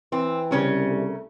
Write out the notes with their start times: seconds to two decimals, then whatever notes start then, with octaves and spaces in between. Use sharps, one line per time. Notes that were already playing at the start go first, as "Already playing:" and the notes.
0.12 E3 C4
0.51 C2 C#3 C#4 A#4
0.89 A3